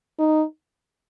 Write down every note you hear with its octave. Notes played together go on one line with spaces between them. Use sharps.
D#4